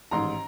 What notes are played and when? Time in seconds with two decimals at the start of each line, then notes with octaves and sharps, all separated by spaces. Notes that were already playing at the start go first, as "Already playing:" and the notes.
0.11 A1 G#2 D#3 A#5 C6